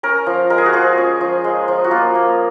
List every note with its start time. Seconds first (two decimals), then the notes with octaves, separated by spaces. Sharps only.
0.03 C#4 A#4
0.26 F3
0.50 G#3 A#4
0.58 G#4
0.66 F#4
0.73 F3 G#4
0.98 C#4
1.21 F3
1.44 G#3
1.68 F3
1.84 F#4
1.91 A#3 F4
2.15 A#3